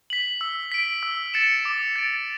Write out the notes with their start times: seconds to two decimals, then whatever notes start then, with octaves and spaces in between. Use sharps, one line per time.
0.10 B6 F#7
0.41 E6
0.72 B6 D7
1.03 E6
1.34 A6 C#7 E7
1.65 D6
1.96 A6 D7